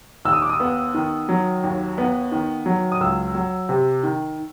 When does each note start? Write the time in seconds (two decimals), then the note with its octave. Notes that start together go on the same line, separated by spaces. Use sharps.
0.25 D#2 E6
0.33 D#6
0.42 D6
0.49 D#6
0.60 B3
0.94 D#3
1.29 F#3
1.64 D#2
1.98 B3
2.32 D#3
2.66 F#3
2.92 D#6
3.00 C#2 E6
3.35 F#3
3.69 C3
4.03 D#3